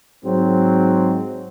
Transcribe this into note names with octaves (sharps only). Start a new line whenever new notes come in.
G#2 F#3 C4